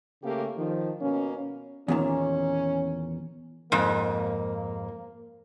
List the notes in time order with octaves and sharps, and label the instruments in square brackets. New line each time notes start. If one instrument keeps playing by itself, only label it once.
[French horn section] C#3 A3 A#3 G4
D#3 F3
B2 A#3 C#4
[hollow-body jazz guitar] E2 A#2 D#3 [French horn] C#4
[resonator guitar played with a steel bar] F2 G#2 [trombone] A#3